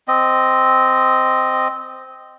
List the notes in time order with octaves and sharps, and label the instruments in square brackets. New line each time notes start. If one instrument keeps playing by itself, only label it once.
[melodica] C4 D#5